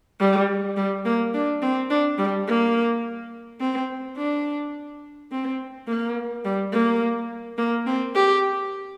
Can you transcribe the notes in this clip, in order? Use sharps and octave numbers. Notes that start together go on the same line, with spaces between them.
G3
G3
A#3
D4
C4
D4
G3
A#3
C4
D4
C4
A#3
G3
A#3
A#3
C4
G4